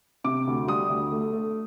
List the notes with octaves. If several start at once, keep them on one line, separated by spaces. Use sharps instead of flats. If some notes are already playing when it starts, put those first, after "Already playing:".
C3 D6
D2
G3 D#6
D2
A3
A3